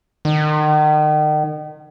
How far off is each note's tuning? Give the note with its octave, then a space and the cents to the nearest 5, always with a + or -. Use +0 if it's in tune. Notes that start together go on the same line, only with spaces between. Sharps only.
D#3 -35